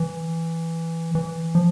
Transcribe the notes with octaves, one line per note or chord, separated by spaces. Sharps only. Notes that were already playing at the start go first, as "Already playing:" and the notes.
Already playing: E3
E3
F3